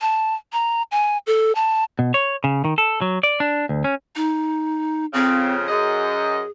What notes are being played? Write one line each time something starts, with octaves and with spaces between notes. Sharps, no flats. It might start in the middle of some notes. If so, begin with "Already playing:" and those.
A5
A#5
G#5
A4
A5
B2
C#5
C#3
D#3
A4
F#3
D5
D4
D2
C#4
D#4
F2 C#3 C4
F#2 G#4 D#5